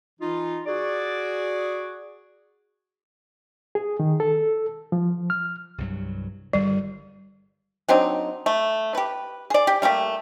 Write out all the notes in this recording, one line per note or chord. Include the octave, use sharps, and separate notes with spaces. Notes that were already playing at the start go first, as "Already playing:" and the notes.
E3 D#4 F4
F#4 G#4 D5
G#4
D#3
A4
F3
F6
C2 G2 F#3
G1 D#3 G3
F#3 C4 D4 D#4
A3
G4 B4
G#4 D5
G4
G3 A3 A#3 G4